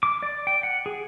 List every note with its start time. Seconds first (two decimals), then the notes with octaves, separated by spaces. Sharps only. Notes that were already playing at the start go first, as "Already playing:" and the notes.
0.03 D6
0.22 D5
0.47 G5
0.63 F#5
0.86 G#4